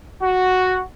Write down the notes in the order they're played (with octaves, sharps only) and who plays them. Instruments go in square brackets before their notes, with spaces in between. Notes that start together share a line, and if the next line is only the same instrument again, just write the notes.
[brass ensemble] F#4